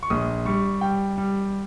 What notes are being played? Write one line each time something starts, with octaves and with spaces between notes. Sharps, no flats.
C#6
A#1 D#6
G3 C#6
G3 G5
G3